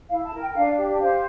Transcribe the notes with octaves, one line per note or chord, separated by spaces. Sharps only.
E4 F5
A5
A#4
G5
D4 F5
G4
C5 F5